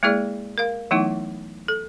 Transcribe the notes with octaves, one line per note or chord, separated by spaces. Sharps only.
G#3 A#3 E4 G#4 D5
A#4 F5
E3 F#3 A3 B3 D#4 E4
A4